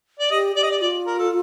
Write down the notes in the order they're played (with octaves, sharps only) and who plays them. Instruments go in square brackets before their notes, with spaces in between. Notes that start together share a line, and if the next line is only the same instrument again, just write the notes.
[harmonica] D5
[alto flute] G4 [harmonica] D#5
[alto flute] G4 [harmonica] D5
[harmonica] D#5
D5
[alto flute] F4 [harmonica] D5
[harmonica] A#4
A4